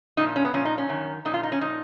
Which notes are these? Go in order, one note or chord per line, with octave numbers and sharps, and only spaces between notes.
A#2 F3 D#4
C#4
B3
A#2 F3 C#4
D#4
C#4
F#2 D#3
A#2 F3 D#4
F4
D#4
C#4
A#2 F3 D#4